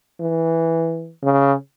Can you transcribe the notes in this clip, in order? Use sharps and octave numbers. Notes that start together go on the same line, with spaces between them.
E3
C#3